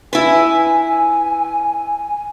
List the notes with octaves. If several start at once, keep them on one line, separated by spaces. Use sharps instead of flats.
E4 B4 G#5